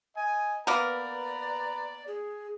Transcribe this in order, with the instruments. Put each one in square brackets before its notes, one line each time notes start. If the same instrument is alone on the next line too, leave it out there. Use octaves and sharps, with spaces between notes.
[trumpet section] D#5 G#5
[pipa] A#3 B3 A#4 [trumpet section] B4 A#5 [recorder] D5
[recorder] G#4